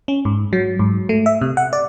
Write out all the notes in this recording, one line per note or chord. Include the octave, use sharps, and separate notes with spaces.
C#4
G#2
F#3
G#2
A3
E5
C3
F#5
D5